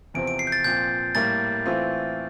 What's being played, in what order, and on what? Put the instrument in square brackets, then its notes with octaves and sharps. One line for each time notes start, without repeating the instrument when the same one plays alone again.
[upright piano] E2 C3 F3 C4 [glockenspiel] D7
[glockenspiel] D7
C7
G6
A6
[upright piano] A#2 F3 C4 [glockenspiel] G6
[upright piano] A2 G3 A#3 [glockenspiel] A6
[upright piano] E3 A3 C4 F4